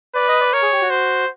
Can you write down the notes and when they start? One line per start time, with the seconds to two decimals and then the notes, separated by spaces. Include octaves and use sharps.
0.15 B4 D5
0.28 D#5
0.40 D5
0.53 A#4 C#5
0.62 G#4
0.72 G4
0.81 F#4
0.90 C5